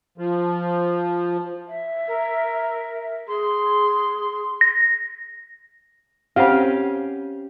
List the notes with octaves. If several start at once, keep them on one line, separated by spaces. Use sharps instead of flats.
F3
E5
A#4
G#4 C6
A#6
C4 C#4 G4 C5 F5 F#5